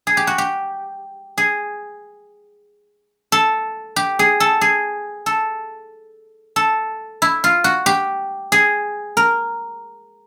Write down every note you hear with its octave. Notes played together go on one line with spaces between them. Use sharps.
G#4
G4
F#4
G4
G#4
A4
G4
G#4
A4
G#4
A4
A4
E4
F4
F#4
G4
G#4
A#4